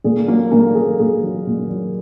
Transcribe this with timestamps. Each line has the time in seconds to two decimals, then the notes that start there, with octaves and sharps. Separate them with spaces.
0.04 A#2 G#4
0.27 F#3 A#3 A#4
0.51 A#2 A#3 A#4
0.75 F#3 G#4
0.99 A#2 G#4
1.23 F#3
1.47 A#2
1.70 F#3